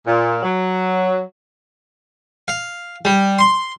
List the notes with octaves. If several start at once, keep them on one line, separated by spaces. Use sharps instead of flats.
A#2
F#3
F5
G3
C6